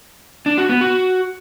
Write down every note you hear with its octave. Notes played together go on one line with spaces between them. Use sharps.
D4
F#4
B3
F#4